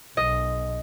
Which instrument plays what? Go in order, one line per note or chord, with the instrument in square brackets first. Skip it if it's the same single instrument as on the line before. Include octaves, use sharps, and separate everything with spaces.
[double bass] B1 [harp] D#5